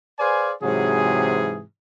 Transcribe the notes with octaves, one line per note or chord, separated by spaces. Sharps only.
G#4 B4 C5 D5 F5 G#5
G#2 C3 E3 F#3 G#4